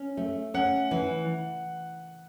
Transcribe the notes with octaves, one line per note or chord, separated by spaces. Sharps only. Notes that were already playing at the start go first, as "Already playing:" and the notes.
Already playing: C#4
A3
C#4 F#5
E3